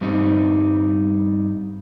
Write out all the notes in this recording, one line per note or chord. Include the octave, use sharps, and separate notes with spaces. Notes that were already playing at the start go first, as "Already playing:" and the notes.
G2 G3 C4 D#4